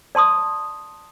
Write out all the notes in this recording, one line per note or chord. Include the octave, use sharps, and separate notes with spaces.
D5 A5 C6 D#6